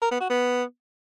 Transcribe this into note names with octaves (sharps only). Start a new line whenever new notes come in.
A#4
B3
F#4
B3